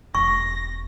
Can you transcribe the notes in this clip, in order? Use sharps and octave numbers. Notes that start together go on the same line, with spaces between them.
E1 C#6 A#6